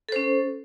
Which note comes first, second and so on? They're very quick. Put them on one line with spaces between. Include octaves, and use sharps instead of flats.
A4 C5 C#4